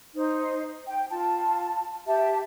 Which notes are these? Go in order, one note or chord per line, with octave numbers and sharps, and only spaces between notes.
D#4 C5
G5
F4 A5
G4 E5 A5